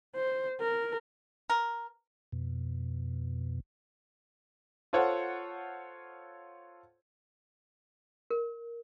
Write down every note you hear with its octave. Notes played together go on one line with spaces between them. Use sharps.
C5
A#4
A#4
F2 B2
F4 A4 C5 C#5 F#5
A#4